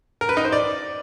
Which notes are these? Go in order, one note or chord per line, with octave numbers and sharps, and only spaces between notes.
A#4
B4
D#4
C5
D5